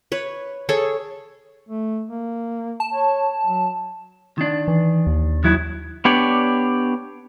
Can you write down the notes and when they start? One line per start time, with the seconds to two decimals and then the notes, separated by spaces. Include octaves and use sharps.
0.12 B4 C#5
0.69 G#4 A4 C#5
1.68 A3
2.09 A#3
2.80 A5
2.94 C#5
3.47 F#3
4.38 D#3 D4
4.68 E3
5.07 D#2
5.44 D#3 F#3 E4
6.05 B3 D4 G4 C#5 D5